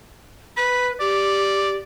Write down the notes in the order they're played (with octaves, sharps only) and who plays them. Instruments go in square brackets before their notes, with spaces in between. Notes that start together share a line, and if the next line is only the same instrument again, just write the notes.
[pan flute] B4 [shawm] B5
[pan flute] G4 [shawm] D5